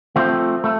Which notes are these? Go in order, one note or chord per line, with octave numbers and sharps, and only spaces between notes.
F3 A3 C4
A3